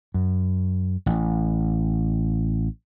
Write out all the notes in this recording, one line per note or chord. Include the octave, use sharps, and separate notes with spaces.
F#2
A1